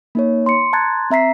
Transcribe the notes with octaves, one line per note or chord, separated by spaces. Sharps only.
A#3 D#4 C#5
C6 C#7
A5 A#5 C6 F#6 G#6 A6
C4 E5 A#5 B6 C7